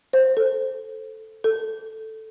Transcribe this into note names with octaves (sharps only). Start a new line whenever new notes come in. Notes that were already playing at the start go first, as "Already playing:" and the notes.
C5
A4
A4